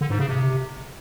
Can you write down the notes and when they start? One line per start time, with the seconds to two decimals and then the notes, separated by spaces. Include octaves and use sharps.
0.01 D3
0.10 G#2
0.19 C#3
0.29 C3